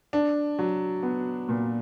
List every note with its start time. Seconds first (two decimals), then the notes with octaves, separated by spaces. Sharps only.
0.13 D4
0.59 F#3
1.03 B3
1.49 A#2